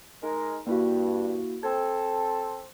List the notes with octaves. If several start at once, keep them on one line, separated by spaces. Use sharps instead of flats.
G#3 D#4 A#4
G2 A#3 E4 F#4
C4 A4 G#6